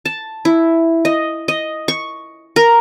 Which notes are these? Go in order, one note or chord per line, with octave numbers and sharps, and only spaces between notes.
A5
E4
D#5
D#5
C#6
A#4